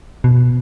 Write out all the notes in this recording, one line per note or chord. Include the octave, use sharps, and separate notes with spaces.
B2